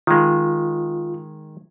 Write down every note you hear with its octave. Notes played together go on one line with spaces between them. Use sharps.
D#3 G#3 F4